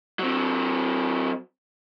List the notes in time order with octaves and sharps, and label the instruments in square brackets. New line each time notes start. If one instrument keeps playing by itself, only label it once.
[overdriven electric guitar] F#3 C4